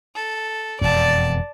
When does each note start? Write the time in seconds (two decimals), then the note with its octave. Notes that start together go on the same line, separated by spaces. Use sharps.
0.15 A4
0.81 E1 F2 D5 A5